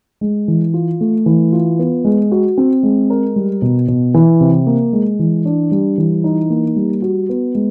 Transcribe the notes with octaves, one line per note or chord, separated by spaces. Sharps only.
G#3
E3
F4
A3
E3
F4
B3
G#3
F#4
C4
G#3
A#4
G3
B2
B2
E3
C3
A#3
G#3
E3
D4
G3
E3
D#4
A#3
G3
F#4
B3
G#3